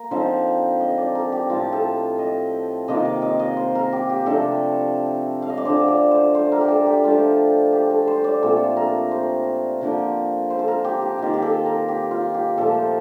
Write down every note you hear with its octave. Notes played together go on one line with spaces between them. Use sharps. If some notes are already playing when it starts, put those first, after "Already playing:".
Already playing: A#3 A#4
D3 F3 C4 D#4 C5
D#5
D5
A#4
G4
A2 F3 C4 F4
A4
D#5
C3 D#3 A#3 F4 D#5
F5
D#5
D#5
C5
A#4
G4
G4
C3 F3 A3 D4 A4
F5
D#5
D5
D3 A3 D4 F4 C5
D5
C5
C5
A#4
G4
A4
G4
F3 A3 D4 F4
G4
A4
C5
D5
A#2 A3 C4 F4 A4
A#4
C5
D3 F3 A#3
C5
A4
A#4
G4
G4
D#3 A#3 F4 G4
G4
A4
A#4
G4
F4
G4
A#2 F3 A3 A4
C5